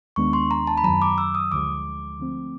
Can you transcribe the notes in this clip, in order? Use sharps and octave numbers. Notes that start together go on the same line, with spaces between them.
D#2 D#3 G#3 B3 D4 C#6
C6
A#5
A5
B5
F#2 D#3 F#3 A#5
D6
E6
D#6
D2 D3 F3 G#3 D6
D3 F3 A3 C4